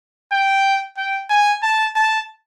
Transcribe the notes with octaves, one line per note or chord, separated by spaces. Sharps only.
G5
G5
G#5
A5
A5